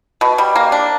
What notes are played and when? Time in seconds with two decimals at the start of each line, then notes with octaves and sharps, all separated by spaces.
0.21 B2
0.38 G3
0.56 A#3
0.72 D4